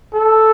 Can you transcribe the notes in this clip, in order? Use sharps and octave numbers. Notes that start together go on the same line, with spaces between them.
A4